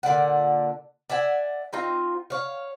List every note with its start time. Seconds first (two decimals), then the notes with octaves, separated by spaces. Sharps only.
0.03 A#2 D3 D5 F#5
1.10 D5 E5 F#5 G#5
1.73 C4 D#4 F4
2.30 C#5 F5